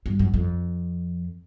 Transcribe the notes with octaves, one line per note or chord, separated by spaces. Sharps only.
G2
F#2
F2